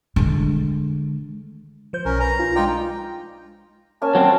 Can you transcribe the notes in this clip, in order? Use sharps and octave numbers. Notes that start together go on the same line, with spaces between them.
D3 G#3
F3 C5 G6
B1 C#4 A#4
B4 A#5
D4 F4
G#3 D#4 F4 D5 G5
A#3 C#4 G#5 A5
F#3 C4